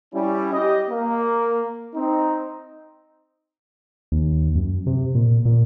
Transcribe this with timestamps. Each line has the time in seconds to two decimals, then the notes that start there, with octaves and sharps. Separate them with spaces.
0.14 G3 C#4 E4
0.53 G4 D#5
0.89 A#3
1.95 C4 D#4
4.12 D#2
4.55 F#2
4.87 C3
5.15 A#2
5.45 A#2